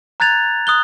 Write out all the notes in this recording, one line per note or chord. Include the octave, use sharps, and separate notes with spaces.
A#5 F#6 G#6 A6 F7
D#6 F#6 G7